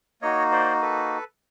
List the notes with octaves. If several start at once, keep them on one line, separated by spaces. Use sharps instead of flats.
A#3 D#4 F#4 C#5 D#5
C5 D5
A4 B4